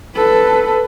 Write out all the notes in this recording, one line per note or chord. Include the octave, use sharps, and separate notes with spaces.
A4 B4